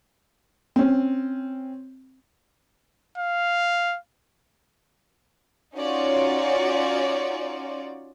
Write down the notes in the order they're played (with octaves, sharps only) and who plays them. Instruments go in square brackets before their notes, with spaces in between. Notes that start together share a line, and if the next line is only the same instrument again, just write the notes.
[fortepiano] C4 C#4
[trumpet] F5
[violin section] C#4 D#4 F4 F#4 C#5 D5